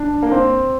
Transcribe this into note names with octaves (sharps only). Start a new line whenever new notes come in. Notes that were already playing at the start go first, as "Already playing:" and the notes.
Already playing: D4
A#3
C4